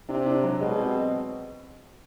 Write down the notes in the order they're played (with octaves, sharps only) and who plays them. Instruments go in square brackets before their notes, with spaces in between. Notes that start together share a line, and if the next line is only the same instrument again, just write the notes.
[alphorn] C3 [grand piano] D4
[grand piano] D4
F#3
[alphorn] B2 [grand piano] G#3
[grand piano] C4